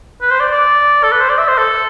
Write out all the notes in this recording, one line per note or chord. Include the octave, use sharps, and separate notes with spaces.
B4
C5
D5
D5
A4
B4
C5
D5
E5
C5
A4